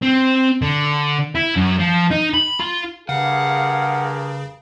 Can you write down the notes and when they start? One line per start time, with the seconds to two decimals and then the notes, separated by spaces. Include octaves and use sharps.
0.02 C4
0.62 D3
1.35 E4
1.56 F#2
1.79 F3
2.11 D#4
2.34 B5
2.60 F4
3.09 G2 C#3 G#4 A#4 F5 F#5